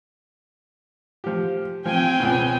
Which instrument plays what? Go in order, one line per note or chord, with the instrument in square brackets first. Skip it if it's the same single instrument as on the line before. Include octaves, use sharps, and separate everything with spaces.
[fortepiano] F3 G4
[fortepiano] F3 [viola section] C4 G5 G#5
[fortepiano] C#2 B2